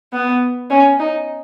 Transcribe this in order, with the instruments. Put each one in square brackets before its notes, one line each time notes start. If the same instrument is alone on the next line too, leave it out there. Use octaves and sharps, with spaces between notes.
[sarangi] B3
C#4
D#4